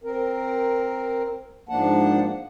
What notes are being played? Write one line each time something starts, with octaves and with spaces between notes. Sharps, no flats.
C4 A#4
G#2 F3 A#3 D4 F#5 A5